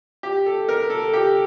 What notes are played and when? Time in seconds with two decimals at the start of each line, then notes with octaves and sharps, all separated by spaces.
0.23 G4
0.46 A4
0.69 A#4
0.90 A4
1.14 G4